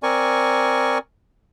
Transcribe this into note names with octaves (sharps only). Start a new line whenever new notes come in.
C4 A#4 D5 G#5 C#6